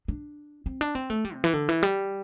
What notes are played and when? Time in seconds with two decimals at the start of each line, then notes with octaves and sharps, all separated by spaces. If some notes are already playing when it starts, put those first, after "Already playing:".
0.08 D4
0.66 C4
0.81 D4
0.95 C4
1.10 A3
1.25 G3
1.34 C3
1.44 E3
1.53 D3
1.69 E3
1.83 G3